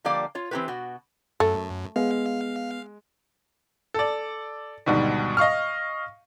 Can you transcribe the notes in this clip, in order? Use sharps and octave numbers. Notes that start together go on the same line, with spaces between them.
D3 F3 G3 A#3 D5 F5
F4 C#5
E3 C4 E4 F#4 G4 B4
B2 F#4
F#2 A3
G#3 B3 F5
A4 D5
D2 G#2 B2 D#3 G3
D#5 F5 C#6 F6